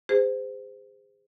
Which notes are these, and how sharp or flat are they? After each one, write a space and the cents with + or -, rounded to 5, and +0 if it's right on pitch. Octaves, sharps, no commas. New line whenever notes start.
G#4 -35 C5 -30